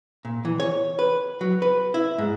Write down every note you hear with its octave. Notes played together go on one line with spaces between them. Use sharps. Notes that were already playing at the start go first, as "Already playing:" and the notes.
A#2
E3
C#5
B4
F#3
B4
E4
G#2